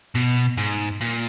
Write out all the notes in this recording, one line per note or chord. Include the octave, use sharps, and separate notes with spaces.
B2
G#2
A#2